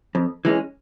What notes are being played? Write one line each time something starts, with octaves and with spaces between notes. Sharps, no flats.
F2
E3 G#3 C#4